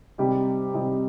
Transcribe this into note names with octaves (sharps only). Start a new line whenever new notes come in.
C3 G3 D#4 G4
C3 G3 D#4 G4